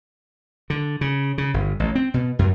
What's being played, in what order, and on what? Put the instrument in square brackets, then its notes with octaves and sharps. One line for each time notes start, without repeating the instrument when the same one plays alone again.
[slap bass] D3
C#3
C#3
G1
A1
C4
B2
F#2